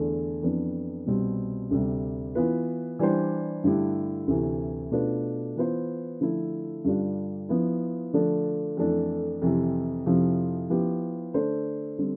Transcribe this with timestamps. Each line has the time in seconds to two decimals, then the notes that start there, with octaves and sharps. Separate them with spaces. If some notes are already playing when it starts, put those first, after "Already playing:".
Already playing: E2 D3 A3 D4 A4
0.42 F2 E3 B3 D4
1.06 C2 B2 G3 C4
1.71 D2 C3 G3
2.35 E3 B3 F4 B4
2.99 E3 G3 D4 G4 C5
3.64 G2 D3 A3 E4 G4
4.27 D2 C3 E3
4.91 B2 A3 D4 F4 B4
5.56 E3 B3 F4 C5
6.21 D3 F3 A3 E4
6.85 G2 D3 G3 D4 F4
7.49 F3 B3 E4
8.13 D3 F3 A3 D4
8.77 F2 E3 A3 D4
9.42 F2 C3 E3
10.06 F2 C3 F3 C4 E4
10.70 F3 B3 E4 G4
11.34 D3 A3 D4 A4 C5
11.99 D3 G3 C4